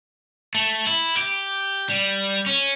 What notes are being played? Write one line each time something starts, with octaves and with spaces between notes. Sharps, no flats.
A3
E4
G4
G3
C#4